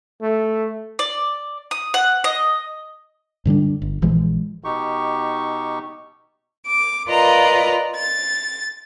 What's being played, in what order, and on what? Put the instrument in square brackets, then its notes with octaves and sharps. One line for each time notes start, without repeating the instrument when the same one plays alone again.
[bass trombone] A3
[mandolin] D5
D#6
F#5
D#5
[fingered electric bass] G2 D3 G3 D4
G1
A#1 E3 F3 G#3
[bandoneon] B2 D#4 G4 C#6
[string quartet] D6
F4 A#4 B4 D5 D#5 A#5
A6